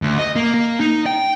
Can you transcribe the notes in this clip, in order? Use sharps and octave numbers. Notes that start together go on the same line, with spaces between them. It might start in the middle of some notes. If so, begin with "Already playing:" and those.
D2
D#5
A#3
A#3
D#4
G5